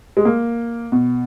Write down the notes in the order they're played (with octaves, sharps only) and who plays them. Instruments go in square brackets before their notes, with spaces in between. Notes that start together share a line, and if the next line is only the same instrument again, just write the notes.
[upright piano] G#3
A#3
B2